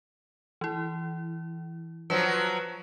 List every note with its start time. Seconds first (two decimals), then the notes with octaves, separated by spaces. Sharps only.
0.61 E3 E4
2.10 F3 F#3 B4